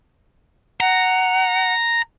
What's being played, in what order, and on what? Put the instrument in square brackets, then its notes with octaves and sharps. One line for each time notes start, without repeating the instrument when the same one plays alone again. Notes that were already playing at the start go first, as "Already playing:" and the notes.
[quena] F#5 [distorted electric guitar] A#5